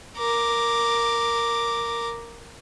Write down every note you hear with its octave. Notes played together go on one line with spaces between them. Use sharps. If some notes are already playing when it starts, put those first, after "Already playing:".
A#4 D6